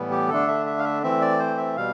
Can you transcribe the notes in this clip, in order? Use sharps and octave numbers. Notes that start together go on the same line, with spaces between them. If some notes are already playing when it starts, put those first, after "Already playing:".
Already playing: A2 E3 G3 B3
G4
D3 A3 D4 A4
E5
E5
F5
E5
E3 A3 C4 E5
D5
C5
E5
B2 G3 F5